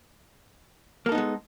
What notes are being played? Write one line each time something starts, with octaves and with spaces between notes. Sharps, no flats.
G#3 A#3 B3 D#4 A4